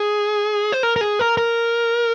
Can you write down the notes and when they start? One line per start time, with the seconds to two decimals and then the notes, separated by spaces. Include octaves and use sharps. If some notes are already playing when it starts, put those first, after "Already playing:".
Already playing: G#4
0.72 C5
0.83 A#4
0.96 A#4
1.01 G#4
1.19 A#4
1.37 A#4